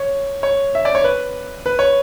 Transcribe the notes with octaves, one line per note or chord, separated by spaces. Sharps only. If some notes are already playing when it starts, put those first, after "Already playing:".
Already playing: C#5
C#5
E5
D5
C#5
B4
B4
C#5